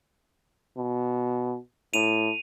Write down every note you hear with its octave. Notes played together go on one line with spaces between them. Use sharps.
B2
A2 D#7 F7